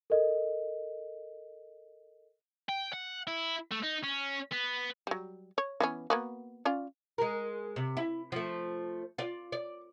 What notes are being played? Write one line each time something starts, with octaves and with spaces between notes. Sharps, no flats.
A4 A#4 D#5
G5
F#5
E4
A3
D#4
C#4
B3
F#3 G3
C#5
E3 B3 C#4
A#3 B3 F#4
C#4 F4 D5
G#3 A#4
C3
E4
F3 A3
F4 D5
D5